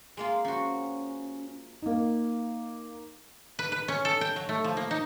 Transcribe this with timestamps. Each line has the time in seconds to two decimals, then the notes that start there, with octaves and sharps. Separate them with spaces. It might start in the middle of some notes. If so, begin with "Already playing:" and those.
0.17 G#3 A#3 F4
0.45 F3 C#4 F#4
1.82 A#3 D#4
3.59 B4
3.72 B4
3.88 C#4
4.05 A4
4.21 G5
4.36 F#3
4.49 A3
4.64 F3
4.77 A#3
4.91 D#4